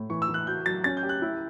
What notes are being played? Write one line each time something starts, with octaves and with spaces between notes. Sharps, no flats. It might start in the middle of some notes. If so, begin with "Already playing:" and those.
Already playing: A2
E3 C#6
E6
E3
F#6
F#4 G6
F#3 A6
C#4 A6
G6
G4
F#6
E4